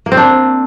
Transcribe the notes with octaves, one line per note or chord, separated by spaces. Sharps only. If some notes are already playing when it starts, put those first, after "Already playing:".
A#3
C4
D4